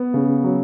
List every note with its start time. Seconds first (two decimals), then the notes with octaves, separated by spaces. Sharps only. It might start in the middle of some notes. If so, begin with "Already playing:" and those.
Already playing: B3
0.14 C#3
0.44 F#3